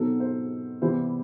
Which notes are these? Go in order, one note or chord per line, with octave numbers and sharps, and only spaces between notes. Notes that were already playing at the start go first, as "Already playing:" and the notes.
Already playing: B2 F#3 C4 D#4 A4
C5
C3 E3 G3 B3 E4 C5